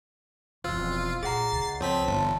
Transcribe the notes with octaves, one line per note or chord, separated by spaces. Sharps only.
E1 F2 F4 C5 E6
A#2 G#4 F#5 A#5 A6 C7
C#2
F2 C4 C#5 A5 B6
G1 E3 A5